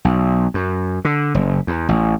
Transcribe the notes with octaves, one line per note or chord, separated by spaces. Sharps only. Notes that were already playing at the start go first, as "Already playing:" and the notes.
B1
F#2
D3
F#1
E2
A1